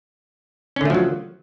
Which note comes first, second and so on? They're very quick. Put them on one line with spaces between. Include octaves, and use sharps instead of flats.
C#4 D3 A3 F3 F#3